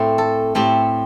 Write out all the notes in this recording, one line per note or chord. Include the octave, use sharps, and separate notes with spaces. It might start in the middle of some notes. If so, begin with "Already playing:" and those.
Already playing: A2 A3 C4 C5
A4
A2 A3 C4 G4